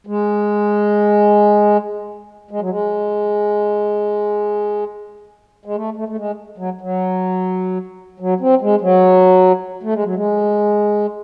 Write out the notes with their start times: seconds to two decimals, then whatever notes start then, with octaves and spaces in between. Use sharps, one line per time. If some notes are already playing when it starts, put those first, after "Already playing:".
0.07 G#3
2.51 G#3
2.61 F#3
2.70 G#3
5.65 G#3
5.76 A3
5.96 A3
6.08 A3
6.17 G#3
6.58 F#3
6.81 F#3
8.20 F#3
8.41 C4
8.61 G#3
8.81 F#3
9.83 A3
9.93 G#3
10.04 F#3
10.15 G#3